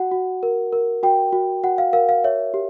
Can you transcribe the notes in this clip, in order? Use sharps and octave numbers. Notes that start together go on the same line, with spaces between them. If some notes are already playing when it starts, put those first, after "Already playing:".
Already playing: F#4 F#5
F#4
A#4
A#4
F#4 G5
F#4
F#4 F#5
F5
A#4 F5
F5
C#5 E5
G4